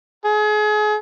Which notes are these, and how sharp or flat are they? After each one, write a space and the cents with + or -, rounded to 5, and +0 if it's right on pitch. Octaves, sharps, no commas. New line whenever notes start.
G#4 +35